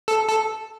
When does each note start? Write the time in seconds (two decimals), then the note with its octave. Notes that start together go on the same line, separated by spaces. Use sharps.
0.08 A4
0.29 A4